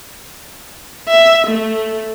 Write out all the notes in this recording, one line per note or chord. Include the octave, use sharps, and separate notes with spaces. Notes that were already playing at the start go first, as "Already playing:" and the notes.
E5
A3